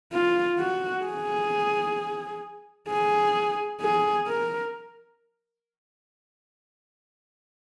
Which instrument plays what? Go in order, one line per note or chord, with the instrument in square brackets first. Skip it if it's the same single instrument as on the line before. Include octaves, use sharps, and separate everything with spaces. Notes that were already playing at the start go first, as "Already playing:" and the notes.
[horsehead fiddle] F4
F#4
G#4
G#4
G#4
A#4